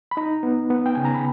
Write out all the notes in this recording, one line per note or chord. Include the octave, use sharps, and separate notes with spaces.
B5
D#4 A#5
B3
B3
G5
C#3 G#5
A#5
B5